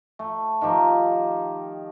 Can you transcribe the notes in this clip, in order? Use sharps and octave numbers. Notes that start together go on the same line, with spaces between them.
A3
D#3 F3 G4 A#4